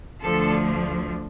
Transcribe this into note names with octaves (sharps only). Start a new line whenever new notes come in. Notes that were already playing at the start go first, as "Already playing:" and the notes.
D2 D3 F3 A4